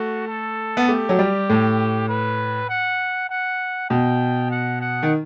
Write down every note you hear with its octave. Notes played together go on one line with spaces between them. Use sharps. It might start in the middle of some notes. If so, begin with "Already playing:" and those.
Already playing: A3 F#4
A4
B3
A3 G4
F#3
G3
A2
B4
F#5
F#5
B2 G5
F#5
F#5
D#3